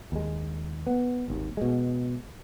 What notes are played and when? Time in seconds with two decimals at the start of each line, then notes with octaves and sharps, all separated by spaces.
0.12 D#2 G#3
0.87 B3
1.28 G#1 D#2
1.57 B2 G#3